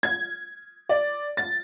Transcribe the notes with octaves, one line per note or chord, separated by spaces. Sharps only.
G#6
D5
A6